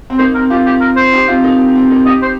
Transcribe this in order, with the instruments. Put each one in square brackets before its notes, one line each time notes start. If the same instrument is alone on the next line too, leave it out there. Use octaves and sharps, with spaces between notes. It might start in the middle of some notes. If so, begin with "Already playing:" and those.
[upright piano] C4
[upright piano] A#3 D#4 [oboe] C5
[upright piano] C4 [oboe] A#4
[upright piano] C4 F4 [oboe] G4
[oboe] G4
A#4
C5
[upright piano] D#4 G4
C4 F4
A#3 D#4
C4
C4
A#3 D#4
[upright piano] D#4 G4 [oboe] D#5
[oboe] C5